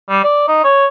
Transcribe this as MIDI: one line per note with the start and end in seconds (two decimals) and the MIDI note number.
0.09 0.20 55
0.24 0.44 74
0.48 0.60 63
0.64 0.86 73